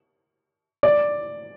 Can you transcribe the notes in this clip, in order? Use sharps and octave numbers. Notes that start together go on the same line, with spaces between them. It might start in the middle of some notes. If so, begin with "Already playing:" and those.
D5